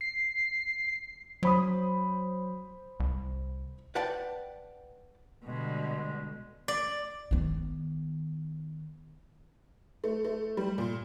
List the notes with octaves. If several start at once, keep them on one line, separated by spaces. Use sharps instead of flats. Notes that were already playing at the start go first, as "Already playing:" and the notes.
C7
F#3 C5 B5 D#6
C2
B4 D5 F#5 G5 A5
B2 D3 G3 G#3
D5
D#3 B3
A3
A3
G3
A#2